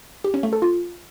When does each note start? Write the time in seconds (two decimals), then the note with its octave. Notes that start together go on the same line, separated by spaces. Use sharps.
0.24 G4
0.34 C#4
0.43 A3
0.53 A4
0.62 F4